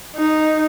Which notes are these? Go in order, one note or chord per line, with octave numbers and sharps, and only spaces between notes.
D#4